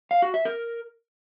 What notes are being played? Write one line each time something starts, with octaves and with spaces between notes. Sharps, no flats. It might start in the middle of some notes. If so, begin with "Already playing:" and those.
F5
F#4
E5
A#4